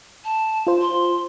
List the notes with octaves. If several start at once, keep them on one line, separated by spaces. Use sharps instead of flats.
A5
F4 C5
C6